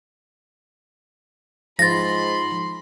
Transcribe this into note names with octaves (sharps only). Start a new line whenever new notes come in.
G#2 F3 B5 C6 A6 A#6